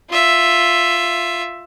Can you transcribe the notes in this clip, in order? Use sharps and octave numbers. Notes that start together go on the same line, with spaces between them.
F4 E5